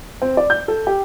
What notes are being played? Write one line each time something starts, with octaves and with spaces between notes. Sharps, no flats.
C4
D5
G6
A4
G4